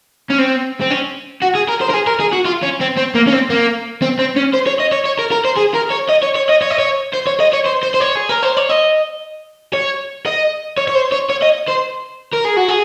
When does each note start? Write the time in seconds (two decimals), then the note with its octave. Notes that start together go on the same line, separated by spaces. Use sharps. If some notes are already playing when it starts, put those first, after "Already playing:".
0.30 C#4
0.38 C4
0.81 C4
0.90 C#4
1.42 F#4
1.55 G#4
1.68 A#4
1.81 C5
1.89 A#4
1.94 G#4
2.07 A#4
2.20 G#4
2.33 F#4
2.46 F4
2.63 C#4
2.81 C4
2.97 C4
3.15 A#3
3.27 C#4
3.33 C4
3.50 A#3
4.02 C4
4.19 C4
4.36 C#4
4.54 C5
4.67 C#5
4.80 D#5
4.93 C#5
5.06 C#5
5.19 A#4
5.32 A#4
5.45 C5
5.57 G#4
5.75 A#4
5.92 C#5
6.10 D#5
6.23 C#5
6.35 C#5
6.49 D#5
6.62 C#5
6.70 D#5
6.79 C#5
7.14 C5
7.27 C#5
7.40 D#5
7.53 C#5
7.66 C5
7.83 C5
7.94 C5
8.00 C#5
8.15 G#4
8.29 A#4
8.43 C5
8.57 C#5
8.69 D#5
9.73 C#5
10.26 D#5
10.78 C#5
10.88 C#5
10.95 C5
11.12 C#5
11.30 C#5
11.42 D#5
11.68 C5
12.33 A#4
12.45 G#4
12.57 F#4
12.69 G#4